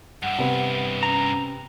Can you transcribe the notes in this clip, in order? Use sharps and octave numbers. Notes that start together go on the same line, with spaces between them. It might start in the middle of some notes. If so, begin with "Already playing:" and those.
G2 E4 F#5
C3 B3
C#4 A#5